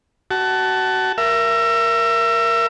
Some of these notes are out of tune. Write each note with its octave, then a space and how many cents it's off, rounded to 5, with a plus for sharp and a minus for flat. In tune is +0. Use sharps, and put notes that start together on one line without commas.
F#4 +25 A5 +0
A#4 +0 E5 +30